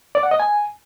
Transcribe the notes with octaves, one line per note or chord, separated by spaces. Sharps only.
D5
F#5
D#5
G#5